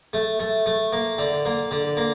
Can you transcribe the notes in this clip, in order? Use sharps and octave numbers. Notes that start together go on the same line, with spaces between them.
A3
A3
A3
A#3
D3
A#3
D3
A#3